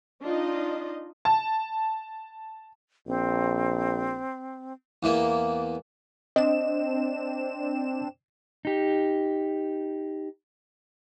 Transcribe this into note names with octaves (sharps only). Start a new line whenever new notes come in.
D4 D#4 F4 D#5
A5
A#1 C4
E2 E3 A#3
C4 D4 D#5 E7
D#4 G4